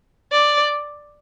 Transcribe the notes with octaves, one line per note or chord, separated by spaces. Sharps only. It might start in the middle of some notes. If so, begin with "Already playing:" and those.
D5